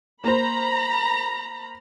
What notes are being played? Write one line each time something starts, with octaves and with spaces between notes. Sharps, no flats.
A#3 C5 A#5 B5